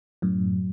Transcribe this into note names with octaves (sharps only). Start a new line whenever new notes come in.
F#2 A2 F#3